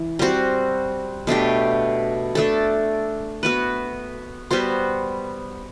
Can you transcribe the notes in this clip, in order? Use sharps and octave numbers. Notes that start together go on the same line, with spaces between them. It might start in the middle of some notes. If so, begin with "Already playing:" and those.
Already playing: E3
G3 C4 F#4
B2 A3 D4 G4
A3 D4 A4
B3 F#4 B4
G3 B3 F#4 C5